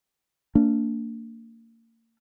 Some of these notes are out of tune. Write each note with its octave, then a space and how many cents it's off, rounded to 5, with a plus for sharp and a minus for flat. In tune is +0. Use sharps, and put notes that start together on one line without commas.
A#3 -35 D4 -20